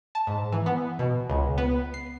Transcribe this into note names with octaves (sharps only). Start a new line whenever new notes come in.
A5
G#2
E3
B3
B2
C#2
B3
C7